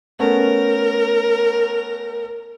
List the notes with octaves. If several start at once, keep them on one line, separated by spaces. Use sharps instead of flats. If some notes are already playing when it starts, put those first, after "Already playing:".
A3 B3 C#4 A#4